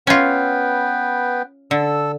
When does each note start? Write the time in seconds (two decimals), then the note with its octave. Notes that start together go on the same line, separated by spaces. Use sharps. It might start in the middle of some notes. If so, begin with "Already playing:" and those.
0.07 B3 C#4 F4 B4 G5
1.71 D3 A4 E6